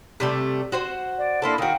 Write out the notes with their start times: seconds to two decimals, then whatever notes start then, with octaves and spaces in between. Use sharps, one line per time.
0.20 C3 G3 A3
0.72 F#4 C5 F#5
1.17 D5
1.42 A#3 D4 E4 A4 B5 C6
1.58 D#3 F#4 F5 G5